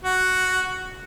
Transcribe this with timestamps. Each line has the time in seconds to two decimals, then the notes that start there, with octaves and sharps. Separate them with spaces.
0.04 F#4